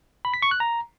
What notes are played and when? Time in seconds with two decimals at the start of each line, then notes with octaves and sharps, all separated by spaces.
0.25 B5
0.34 B6
0.42 C#6
0.51 F#6
0.60 A#5